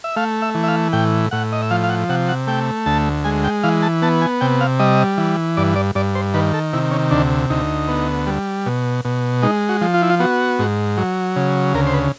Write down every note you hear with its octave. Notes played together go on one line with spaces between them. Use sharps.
E5
A3 F5
E5
E3
E5
F5
A2 G5
A2 F#5
D#5
E5
F3 F5
F5
F#5
C3 F#5
F#5
A3 G5
D2 A5
G#3 G#5
G5
E3 F5
A5
B3 A5
G#5
C3 G5
F5
G3 D#5
E3
G2 D5
D5
G2 D5
C5
D#3 B4
A4
C3 E4
C#4
D2 D4
D2 D#4
B3
G3
B2
B2
G#3 D#4
F#4
F3
F4
E4
F4
B3 F#4
G#2
F#3
C#3
D2 A#4
C5
B4